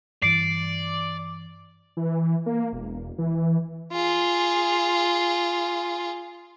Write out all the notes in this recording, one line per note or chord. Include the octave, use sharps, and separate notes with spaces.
G2 E3 D5 C7 D7
E3
A#3
E1
E3
F4 G#4